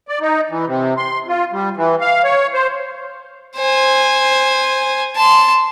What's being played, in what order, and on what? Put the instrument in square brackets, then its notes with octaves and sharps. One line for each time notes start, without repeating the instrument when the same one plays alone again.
[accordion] D5
D#4
E3
C3
C6
F4
G3
E3
F5
C#5
C5
[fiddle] C5 G#5
A5 C6